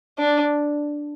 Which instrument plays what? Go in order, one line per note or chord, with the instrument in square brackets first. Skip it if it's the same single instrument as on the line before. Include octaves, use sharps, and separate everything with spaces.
[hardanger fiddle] D4